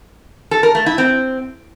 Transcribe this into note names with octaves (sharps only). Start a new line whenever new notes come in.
A4
A#4
A3
E4
C4